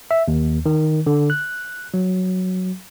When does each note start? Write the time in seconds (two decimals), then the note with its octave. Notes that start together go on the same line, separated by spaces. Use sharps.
0.11 E5
0.28 D#2
0.66 D#3
1.06 D3
1.30 F#6
1.94 F#3